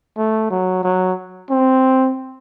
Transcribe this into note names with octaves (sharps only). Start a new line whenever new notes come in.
A3
F#3
F#3
C4